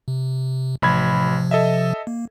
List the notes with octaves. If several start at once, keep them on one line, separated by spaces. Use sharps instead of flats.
C3
A1 C3 F3 B5 G#6
A4 D#5 E5
A#3